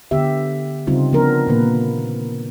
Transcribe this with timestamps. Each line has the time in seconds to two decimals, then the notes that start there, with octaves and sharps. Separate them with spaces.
0.11 D3 B3 G4 E5
0.87 C#3 G3 C4 D#4 F4
1.13 F3 B3 D4 A#4
1.47 A#2 D#3 A#3 B4